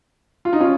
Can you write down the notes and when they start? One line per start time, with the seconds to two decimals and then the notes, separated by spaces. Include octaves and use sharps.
0.45 F4
0.53 D#4
0.60 C#4 F4